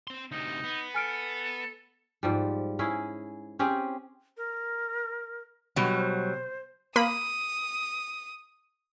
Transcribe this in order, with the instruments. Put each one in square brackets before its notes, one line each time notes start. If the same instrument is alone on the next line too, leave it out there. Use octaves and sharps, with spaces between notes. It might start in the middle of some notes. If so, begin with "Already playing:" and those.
[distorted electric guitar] C4 C6
[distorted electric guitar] D2 C3 [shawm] D#4
[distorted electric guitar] B3
[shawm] A4 [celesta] G#5 F6 D7
[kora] G#2 F3 G3
C#4 E4 G#4
C4 C#4 G4 G#4
[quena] A#4
[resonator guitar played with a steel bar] B2 F#3 G3
[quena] C5
[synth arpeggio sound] A#3 B5 [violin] D#6